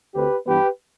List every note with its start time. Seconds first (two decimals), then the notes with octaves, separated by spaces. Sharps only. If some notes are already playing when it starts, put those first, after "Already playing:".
0.14 D2 D3 A3 C4 G4 B4
0.46 G2 E3 B3 G4 B4